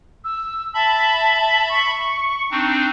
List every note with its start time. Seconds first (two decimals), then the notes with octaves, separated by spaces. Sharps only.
0.24 E6
0.74 E5 A5 B5
1.69 C#6
2.51 C4 D4 D#4